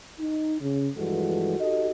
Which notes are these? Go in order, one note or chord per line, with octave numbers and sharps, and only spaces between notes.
D#4
C#3
G2 E3 F3 G#3 F#4 A4
D#4 F#4 G4 A4 D#5